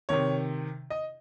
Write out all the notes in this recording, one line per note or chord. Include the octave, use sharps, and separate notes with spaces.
C3 D#3 C#5
D#5